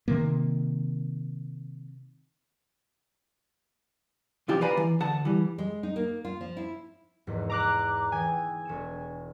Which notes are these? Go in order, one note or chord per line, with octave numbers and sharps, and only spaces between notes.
C3 D#3 A#3
B1 E3 F3 F4 G4
B4 D5 F5 G#5 A#5 B5
E3
D2 F#5 A5
E3 G3
G#3
D#4
A#3
F4
F3
E4
F1 E2 G#2
A#5 D6 E6 F#6 C7 D7
E3 G5 G#5 D#6
E1 C#5 E7